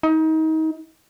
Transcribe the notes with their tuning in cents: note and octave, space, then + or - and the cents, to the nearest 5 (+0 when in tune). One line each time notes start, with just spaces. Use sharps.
D#4 +30